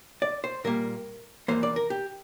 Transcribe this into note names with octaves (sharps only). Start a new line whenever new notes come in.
D5
C5
A#2 G3 A#3 A#4
E2 E3 A#3 C5
D5
A#4
G4